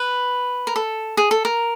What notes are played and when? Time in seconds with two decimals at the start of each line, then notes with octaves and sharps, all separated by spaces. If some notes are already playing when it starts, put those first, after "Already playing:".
Already playing: B4
0.67 A#4
0.76 A4
1.17 G#4
1.31 A4
1.45 A#4